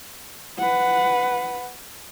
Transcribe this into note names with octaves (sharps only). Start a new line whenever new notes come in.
B4 F#5